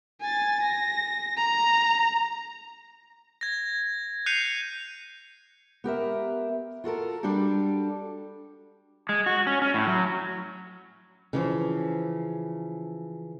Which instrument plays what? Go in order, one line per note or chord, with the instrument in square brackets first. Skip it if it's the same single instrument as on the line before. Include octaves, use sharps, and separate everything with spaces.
[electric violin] G#5 A6
A#6
A#5
[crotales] G#6 A#6
F#6 G6 C7 C#7 D#7 F7
[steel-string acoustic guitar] B3 G4 A#4 E5
F4 F#4 A4 A#4
G3 D4 F#4 G4 A4
[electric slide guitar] G#3
F#4
C#4
C#4
A2
F#3
[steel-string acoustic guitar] C#3 E3 F3